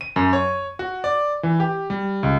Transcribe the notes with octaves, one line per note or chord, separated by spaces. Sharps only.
D#7
F#2
C#5
F#4
D5
E3
G4
G3
C#2